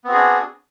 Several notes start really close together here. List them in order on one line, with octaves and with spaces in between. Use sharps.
B3 C4 F#4 G#4 D4